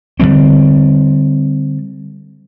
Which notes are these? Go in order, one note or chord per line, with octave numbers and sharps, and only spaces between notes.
D3 F#3 G3 C4